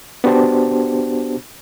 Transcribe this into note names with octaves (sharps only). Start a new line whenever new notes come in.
B3 D4 F#4 G4 C5 A5